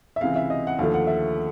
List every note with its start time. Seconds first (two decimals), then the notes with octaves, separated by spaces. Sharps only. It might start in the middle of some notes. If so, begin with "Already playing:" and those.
0.16 E5
0.21 C#2 C3 E3 F5
0.36 E5
0.50 D#5
0.67 F#5
0.79 D#2 D3 F3 A3 F5
0.94 F#5
1.07 E5